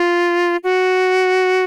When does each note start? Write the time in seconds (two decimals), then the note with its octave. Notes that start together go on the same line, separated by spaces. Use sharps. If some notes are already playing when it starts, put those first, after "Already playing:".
Already playing: F4
0.64 F#4